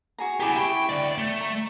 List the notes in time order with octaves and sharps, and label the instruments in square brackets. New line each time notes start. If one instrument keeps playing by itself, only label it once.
[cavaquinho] F#4 G#4 A#5
[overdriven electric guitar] E4 G4 [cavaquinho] G#4 G5 D6
[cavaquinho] E4 B5 C#6 [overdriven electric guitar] G5
[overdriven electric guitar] D2 D5
A3
[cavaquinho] A#5